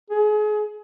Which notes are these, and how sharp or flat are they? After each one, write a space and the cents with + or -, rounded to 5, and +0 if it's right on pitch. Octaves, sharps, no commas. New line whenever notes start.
G#4 +30